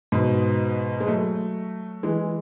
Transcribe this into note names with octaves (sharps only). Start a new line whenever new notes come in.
G#2 B2
G#3
F#3 A3
E3 G#3